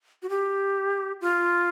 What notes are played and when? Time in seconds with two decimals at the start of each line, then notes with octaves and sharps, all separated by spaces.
0.22 F#4
0.29 G4
1.21 F4